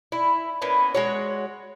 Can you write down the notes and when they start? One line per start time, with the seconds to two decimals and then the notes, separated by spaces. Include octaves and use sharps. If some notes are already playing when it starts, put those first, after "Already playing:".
0.12 E4
0.62 A#3 B3 C#4
0.95 G#3 F#4 C#5